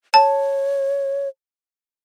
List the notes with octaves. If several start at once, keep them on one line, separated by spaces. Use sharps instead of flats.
C#5 A5